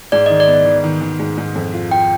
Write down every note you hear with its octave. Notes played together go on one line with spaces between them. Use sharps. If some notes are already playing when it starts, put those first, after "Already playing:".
G#2 D5
D#3 D#5
D5
B3
D#3
D#3
D#3
G#2
G#2
F2
F4
F4 G5